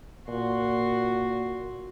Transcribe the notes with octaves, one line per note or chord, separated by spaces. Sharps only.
A#2 F#4 C6